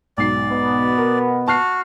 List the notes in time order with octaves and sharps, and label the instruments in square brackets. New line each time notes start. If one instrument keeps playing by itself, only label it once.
[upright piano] B1 G#2 C7 [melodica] D5
[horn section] B2 B3
[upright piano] A#4
[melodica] F#4 [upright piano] A5 F6 C7